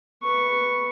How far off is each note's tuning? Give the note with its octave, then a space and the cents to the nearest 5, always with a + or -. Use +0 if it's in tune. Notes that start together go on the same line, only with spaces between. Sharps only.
B4 +0 C#6 +0